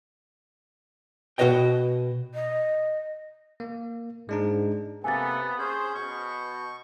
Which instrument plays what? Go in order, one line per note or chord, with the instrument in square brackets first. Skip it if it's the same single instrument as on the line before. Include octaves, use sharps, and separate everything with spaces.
[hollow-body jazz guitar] B2 F#4 B4 C#5 D#5 G5
[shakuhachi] D#5
[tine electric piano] A#3
[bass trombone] G#2 [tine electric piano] G#3 D4 D#4
[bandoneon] C3 A#3 [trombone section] B3 [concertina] A4 [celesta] G#5 A6
[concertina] C#4 G#4 [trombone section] C5 [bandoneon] G6
[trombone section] B2 [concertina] C#6